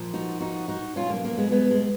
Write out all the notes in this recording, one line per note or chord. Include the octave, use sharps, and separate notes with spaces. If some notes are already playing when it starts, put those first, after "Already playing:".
Already playing: A#2 F3
D#4 F#4
D#4 F#4
D#4 F#4
B2 F#3 C#4 F4
A#3
A#3
G#3 B3
G#3 B3
G#3